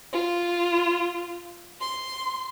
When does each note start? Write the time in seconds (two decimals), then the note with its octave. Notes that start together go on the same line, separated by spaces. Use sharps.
0.12 F4
1.79 C6